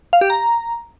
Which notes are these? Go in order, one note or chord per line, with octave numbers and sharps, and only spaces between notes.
F5
G4
A#5